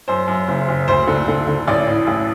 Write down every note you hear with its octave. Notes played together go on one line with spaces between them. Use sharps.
F#2 C5
F#2
F#1
F#1
D2 C5
D3
D3
D3
A1 D5
A2
A1